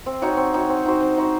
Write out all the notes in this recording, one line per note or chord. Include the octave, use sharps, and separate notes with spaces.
C4
D#4 F#4 C#5
C4
D#4 F#4 C#5
C4
D#4 F#4 C5
C4
D#4 F#4 C5